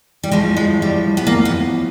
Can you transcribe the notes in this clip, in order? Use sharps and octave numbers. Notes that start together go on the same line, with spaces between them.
G3
A2 F3 G#3
G#3
G3
B3
A#3
B3